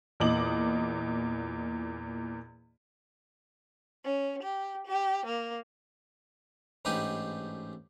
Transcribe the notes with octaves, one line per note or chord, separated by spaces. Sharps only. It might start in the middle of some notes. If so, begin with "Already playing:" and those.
E2 A#2 D#5 D6 F#7
C#4
G4
G4
A#3
A1 G#2 D4 D#4 G4 B4